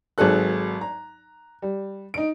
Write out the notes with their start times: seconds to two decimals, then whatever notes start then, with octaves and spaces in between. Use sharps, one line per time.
0.18 G#1 F#3 G#4 A4 F#6
0.81 A#5
1.62 G3
2.14 D#4 D7